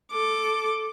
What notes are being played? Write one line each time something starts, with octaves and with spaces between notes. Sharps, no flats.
A4 D6